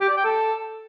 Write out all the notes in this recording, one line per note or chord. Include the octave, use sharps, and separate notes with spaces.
G4
D5
G5
A4